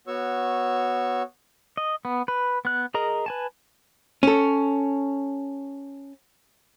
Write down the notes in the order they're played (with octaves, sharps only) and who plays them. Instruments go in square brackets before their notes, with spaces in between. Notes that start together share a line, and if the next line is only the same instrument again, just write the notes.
[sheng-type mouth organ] B3 F#4 C#5 C#6 E6
[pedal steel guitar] D#5
B3
B4
B3 F#6
G#4 A#4 D#5 A#5
B4 G#5 A5
[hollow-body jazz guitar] C#4 A4